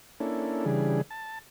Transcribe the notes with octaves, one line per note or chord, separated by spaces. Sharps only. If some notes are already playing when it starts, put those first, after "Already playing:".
A#3 C#4 D4 E4 A4
C#3 E3 G3 D4 G#4
A5